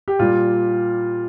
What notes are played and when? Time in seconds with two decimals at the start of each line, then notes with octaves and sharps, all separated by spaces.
0.08 G4
0.19 A#2 G3 F4